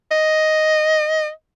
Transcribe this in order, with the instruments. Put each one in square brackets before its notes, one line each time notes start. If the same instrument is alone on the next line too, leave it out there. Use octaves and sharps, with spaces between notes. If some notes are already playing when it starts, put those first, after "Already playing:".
[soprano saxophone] D#5